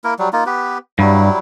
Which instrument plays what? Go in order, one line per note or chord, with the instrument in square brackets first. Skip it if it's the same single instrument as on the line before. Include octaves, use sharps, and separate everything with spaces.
[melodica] A#3 E4 A#4
F#3 G3
A#3 D#4 F4
B3 G4 B4
[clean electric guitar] G2 [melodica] F#3 G3 E4